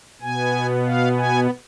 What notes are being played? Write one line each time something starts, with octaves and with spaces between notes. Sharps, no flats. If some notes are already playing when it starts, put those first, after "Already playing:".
B2 B3 G#5
F5
G#5